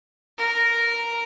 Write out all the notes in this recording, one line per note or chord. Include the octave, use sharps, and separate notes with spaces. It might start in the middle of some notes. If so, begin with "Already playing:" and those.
A#4